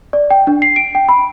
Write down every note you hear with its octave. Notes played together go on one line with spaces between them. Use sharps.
D5
G5
D4
C7
D7
G5
B5